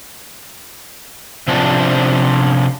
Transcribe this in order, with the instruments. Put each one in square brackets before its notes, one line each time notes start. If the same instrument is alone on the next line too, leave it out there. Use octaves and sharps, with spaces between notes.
[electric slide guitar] C3 F3 C#4 D4 F4